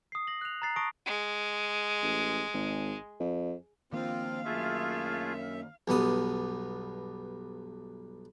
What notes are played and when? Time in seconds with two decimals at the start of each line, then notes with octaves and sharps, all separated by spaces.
0.12 D#6 C7
0.27 A#6 F#7
0.41 F#6 F7
0.62 A#5 F#6 A6 C7
0.76 A5 C#6 D#6 A#6 D7
1.06 G#3
2.03 A1
2.54 G#1
3.20 F2
3.92 D#3 F3 A#3 C4 D4 F4 F5
4.45 F#2 A3 F4 G#4 E5
5.88 B1 G2 B3 D#6